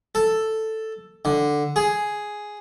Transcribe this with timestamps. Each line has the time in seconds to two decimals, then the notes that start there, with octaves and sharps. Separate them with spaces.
0.15 A4
1.25 D3
1.76 G#4